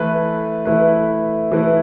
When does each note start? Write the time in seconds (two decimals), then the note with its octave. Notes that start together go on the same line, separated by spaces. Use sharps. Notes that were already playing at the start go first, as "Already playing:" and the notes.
Already playing: E3 A3 E4 B4
0.65 E3 A3 E4 B4
1.51 E3 A3 E4 B4